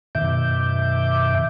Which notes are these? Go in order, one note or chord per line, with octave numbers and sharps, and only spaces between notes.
F#2 B2 D#3 E5 D6 G6